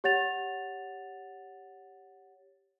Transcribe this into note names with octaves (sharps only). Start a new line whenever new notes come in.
G4 C#5 F#5 A6 F7